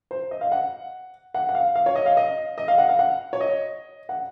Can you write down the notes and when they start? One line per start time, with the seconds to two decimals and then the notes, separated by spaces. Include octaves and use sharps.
0.11 C5
0.31 D#5
0.41 F5
0.52 F#5
1.34 F#5
1.49 F#5
1.55 F5
1.76 F5
1.86 C#5
1.96 D#5
2.06 F5
2.17 D#5
2.58 D#5
2.68 F5
2.78 F#5
2.89 F5
2.99 F#5
3.33 C#5
3.41 D#5
4.09 F#5